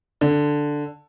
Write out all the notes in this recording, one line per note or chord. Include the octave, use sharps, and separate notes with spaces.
D3